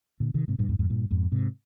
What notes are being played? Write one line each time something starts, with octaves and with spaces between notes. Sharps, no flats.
A#2 D3
C3 D#3
G#2 C3
G2 A#2
F2 G#2
F2 G#2
G2 A#2
F2 G#2
G#2 C3